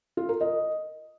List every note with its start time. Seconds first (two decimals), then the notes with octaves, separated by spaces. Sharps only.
0.17 F4
0.29 A#4
0.41 D#5